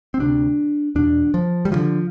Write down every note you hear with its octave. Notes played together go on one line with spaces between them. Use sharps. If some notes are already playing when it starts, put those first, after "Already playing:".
C4
D2 C3 D4
E2 B2 D4
F3
G3
D2 D3 F3